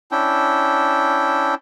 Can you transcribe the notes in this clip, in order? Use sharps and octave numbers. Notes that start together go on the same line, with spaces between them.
C#4 D4 E4 G5